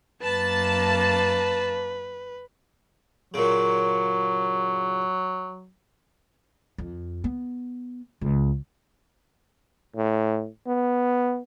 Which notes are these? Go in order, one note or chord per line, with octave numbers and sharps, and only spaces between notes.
F#2 A#3 B4 A5
A#2 C#3 F#3
F2
B3
C#2
A2
B3